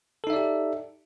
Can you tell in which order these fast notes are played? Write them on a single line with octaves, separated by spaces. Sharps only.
A4 D#4 E5 D5 G4